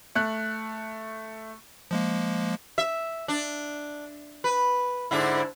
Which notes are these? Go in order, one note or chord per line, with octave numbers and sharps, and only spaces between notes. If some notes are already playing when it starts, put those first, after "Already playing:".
A3 F#6
F3 G#3 A#3
E5
D4
B4
G#2 D3 E4